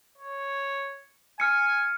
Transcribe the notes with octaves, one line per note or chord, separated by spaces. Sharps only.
C#5
G#5 F6 C#7